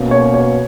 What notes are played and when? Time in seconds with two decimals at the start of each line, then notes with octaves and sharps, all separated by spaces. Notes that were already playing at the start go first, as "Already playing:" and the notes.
Already playing: B2 A#3 C#4
0.11 C#5
0.34 C#5